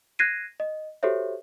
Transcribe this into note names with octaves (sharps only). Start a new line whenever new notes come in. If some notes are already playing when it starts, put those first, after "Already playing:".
F#6 G#6 A#6 C7 D#7
D#5
F#4 G4 A4 C5 C#5 E5